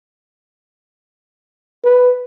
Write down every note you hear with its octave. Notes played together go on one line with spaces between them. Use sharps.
B4